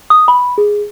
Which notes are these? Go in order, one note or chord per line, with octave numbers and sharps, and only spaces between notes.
D#6
B5
G#4